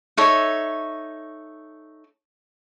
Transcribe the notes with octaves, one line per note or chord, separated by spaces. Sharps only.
D#4 A4 C#5 E5